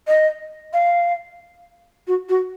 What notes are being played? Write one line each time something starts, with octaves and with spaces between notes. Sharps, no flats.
D#5
F5
F#4
F#4